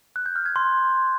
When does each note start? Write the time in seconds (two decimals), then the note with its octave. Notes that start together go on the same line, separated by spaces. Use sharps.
0.16 F#6
0.26 G6
0.36 F6
0.46 G#6
0.56 C6